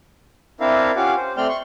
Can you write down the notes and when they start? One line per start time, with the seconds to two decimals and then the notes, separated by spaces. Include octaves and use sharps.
0.60 C4 D4 E4 A#4 E5 F5
0.96 C#4 F4 G4 F5 F#5 D6
1.16 C5
1.37 A3 C4 D5 G5 C6 F6
1.49 C6 C#6